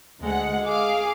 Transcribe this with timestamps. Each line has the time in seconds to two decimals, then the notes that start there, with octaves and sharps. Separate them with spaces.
0.23 D2 G#3 F#5
0.66 G#4 F5 D6